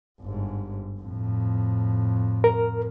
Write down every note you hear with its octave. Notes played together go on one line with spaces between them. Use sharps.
G1 G#2
F2 A2
A#4